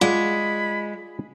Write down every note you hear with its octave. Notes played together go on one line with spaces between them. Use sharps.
G#3 F4 D5 F#5 B5